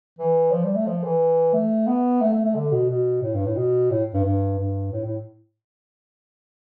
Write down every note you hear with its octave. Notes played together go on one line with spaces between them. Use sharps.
E3
F3
G3
A3
F3
E3
A3
B3
A3
A3
A3
D3
B2
B2
A2
G2
A2
B2
A2
G2
G2
G2
A2
A2